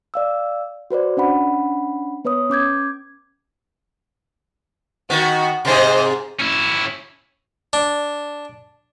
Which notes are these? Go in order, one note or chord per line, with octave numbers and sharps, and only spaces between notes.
D5 F5 E6
F#4 B4 C5 D5
C#4 D4 F#5 B5
B3 B4 C#5 D#6
C#4 D6 G6 G#6
D#3 B3 F#4
G#2 C3 C5 D#5
C#4 E4
D4